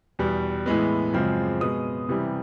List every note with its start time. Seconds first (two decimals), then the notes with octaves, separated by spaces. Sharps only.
0.19 E2 B2 G3
0.66 A2 E3 G#3 B3
1.13 F#2 C#3 F3 G#3 C4
1.60 B2 G#3 B3 D#6
2.09 C3 E3 G3